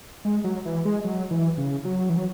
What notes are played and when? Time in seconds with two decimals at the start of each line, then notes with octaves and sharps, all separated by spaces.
0.25 G#3
0.44 F#3
0.65 E3
0.85 G#3
1.04 F#3
1.31 E3
1.58 C#3
1.85 F#3
2.09 E3
2.17 F#3